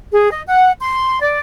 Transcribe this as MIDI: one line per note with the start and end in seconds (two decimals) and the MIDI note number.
0.11 0.29 68
0.30 0.41 75
0.46 0.71 78
0.80 1.18 84
1.21 1.38 74